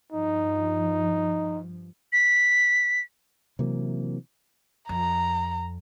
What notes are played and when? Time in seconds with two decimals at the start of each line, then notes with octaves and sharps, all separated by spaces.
0.13 G2 F3 D#4
2.13 B6
3.59 C3 E3 F#3 A#3
4.89 F2 A#5